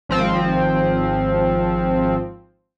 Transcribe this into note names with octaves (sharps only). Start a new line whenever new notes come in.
G#1 F3 C4